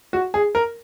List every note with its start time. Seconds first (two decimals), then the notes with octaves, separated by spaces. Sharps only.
0.13 F#4
0.34 G#4
0.55 A#4